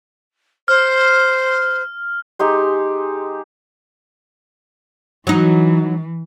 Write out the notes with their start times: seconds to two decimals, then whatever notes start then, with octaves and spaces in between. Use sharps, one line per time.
0.68 C5 F6
2.39 G#3 D#4 G4 C6
5.27 E3 F#3 D#4